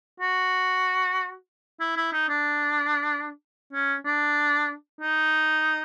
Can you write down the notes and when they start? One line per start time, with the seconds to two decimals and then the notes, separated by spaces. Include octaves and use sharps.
0.20 F#4
1.80 E4
1.97 E4
2.13 D#4
2.29 D4
3.73 C#4
4.05 D4
5.01 D#4